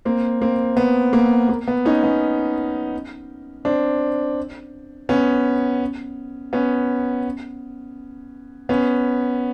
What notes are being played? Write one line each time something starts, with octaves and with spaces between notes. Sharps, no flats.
A#3 C4
A#3 C4
B3
A#3
A#3
B3
C#4 D#4
B3 C#4
C4 D4
B3 C#4
B3 C#4
B3 C#4